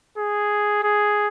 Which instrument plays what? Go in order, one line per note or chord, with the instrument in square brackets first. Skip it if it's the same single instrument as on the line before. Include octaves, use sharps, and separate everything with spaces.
[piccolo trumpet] G#4
G#4